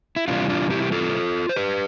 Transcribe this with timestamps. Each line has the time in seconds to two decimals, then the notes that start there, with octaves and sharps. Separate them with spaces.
0.16 E4
0.28 C3 E3 G3 D4 F4
0.49 D4 F4
0.70 E4 G4
0.82 G4
0.92 F4 A4
1.49 C5
1.56 G4 B4